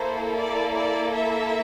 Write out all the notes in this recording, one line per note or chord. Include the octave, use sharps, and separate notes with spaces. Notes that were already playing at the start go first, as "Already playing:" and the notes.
Already playing: A#3 E4 A4 C5
D5
D5
E5